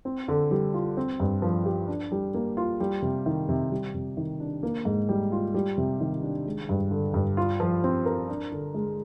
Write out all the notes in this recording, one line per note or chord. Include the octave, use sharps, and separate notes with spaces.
C4
D3
G3
F4
C4
G2
F3
G4
D4
G3
A#3
F4
G3
C3
D#3
C3
G3
C3
D#3
D4
A#3
G#2
G3
F4
G3
C3
D#3
D4
G#3
G2
D3
G2
F4
F3
C4
A#4
D4
D3
G#3